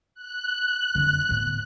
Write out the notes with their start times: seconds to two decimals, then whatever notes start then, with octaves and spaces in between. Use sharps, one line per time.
0.14 F#6
0.95 F2 D3
1.29 A2 B3